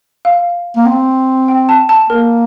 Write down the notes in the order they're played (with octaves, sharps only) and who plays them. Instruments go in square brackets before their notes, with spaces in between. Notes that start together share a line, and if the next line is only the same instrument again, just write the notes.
[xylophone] F5
[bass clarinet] A#3
C4
[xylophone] G5
A5
A5
[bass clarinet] A#3 [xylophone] A#4